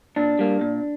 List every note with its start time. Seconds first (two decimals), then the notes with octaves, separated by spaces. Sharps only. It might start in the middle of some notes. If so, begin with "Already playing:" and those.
0.16 A#2 D4
0.39 G3 A#3
0.61 A#2